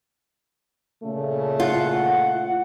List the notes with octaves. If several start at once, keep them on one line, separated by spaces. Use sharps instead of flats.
A#2 C#3 A3
F4 F#5